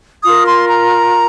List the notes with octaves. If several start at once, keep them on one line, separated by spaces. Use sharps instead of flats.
F4 A#4 D#6
C6
A#5